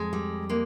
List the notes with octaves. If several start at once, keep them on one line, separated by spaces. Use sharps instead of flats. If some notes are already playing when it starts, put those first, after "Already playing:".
Already playing: F2 G#3
G3
G#3 A#3